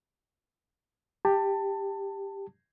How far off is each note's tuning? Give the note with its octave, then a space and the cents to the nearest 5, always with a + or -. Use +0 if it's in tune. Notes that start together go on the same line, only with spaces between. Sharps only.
G4 +10 A5 +20